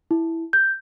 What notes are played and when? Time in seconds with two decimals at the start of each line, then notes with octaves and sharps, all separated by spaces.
0.11 E4
0.53 G6